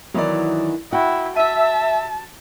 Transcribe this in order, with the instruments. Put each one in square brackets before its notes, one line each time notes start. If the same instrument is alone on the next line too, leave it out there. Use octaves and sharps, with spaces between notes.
[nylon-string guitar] D#3 E3 B3 [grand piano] F#3 D5
[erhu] E4 [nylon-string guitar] F#4 [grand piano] F#5 G5
[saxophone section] E5 [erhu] A5 [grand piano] D#7